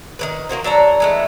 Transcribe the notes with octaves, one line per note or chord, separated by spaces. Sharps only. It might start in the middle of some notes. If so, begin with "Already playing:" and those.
D#3 E3 B4
D#3 A#3 F#4 C5
F#3 D4 A4 A#5
E3 G#3 A3